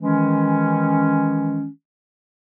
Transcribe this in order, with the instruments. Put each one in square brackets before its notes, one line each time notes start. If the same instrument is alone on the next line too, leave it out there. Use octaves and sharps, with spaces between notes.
[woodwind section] D#3 E3 G#3 C#4